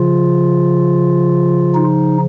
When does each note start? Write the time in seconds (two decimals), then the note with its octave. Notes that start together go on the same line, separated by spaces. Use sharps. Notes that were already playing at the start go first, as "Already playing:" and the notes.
Already playing: C#3 F3 F4
1.74 D#4